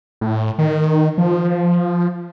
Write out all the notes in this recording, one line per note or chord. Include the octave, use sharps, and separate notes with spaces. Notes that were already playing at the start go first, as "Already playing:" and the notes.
A2
D#3
F3